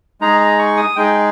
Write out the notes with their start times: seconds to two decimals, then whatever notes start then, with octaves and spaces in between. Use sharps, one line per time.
0.21 G#3 D#4 G#4 A#5
0.40 A#5
0.59 C#6
0.77 D#6
0.96 G#3 D#4 G#4 G5